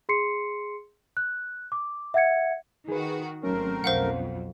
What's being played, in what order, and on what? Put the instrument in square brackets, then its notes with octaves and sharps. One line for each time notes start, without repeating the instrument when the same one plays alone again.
[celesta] G#4 C6 C7 C#7
F#6
D6
E5 F#5 G#6 C#7
[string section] D#3 F#4 [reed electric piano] G#4 B4
[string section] G#1 C4 [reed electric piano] F#3 C#4 [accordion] A3 A#4
[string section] B1 F2 [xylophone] C5 F5 F#5